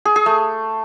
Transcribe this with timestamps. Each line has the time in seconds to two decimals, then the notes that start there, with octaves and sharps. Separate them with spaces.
0.05 G#4
0.16 G#4
0.26 A3